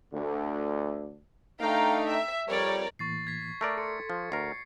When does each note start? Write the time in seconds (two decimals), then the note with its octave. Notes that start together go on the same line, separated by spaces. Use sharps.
0.13 D2 D3
1.61 A3 D4 D#4 F5 G5 A#5
2.09 E5
2.49 F2 G3 A#4 C#5 D5
2.99 A2 E3 A#3 C#6 A6 C7
3.27 G#6 B6
3.61 A3 A#4 D5
3.78 A4 C6 C#7
4.10 F3
4.32 D2 A#4 C7